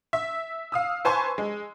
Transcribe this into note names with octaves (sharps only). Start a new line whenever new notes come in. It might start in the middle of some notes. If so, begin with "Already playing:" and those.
E5
F5 D#6 E6
B4 C5 G#5 A5 C6 C#6
G#3